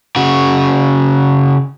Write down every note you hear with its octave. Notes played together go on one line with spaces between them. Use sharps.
C#3 F#4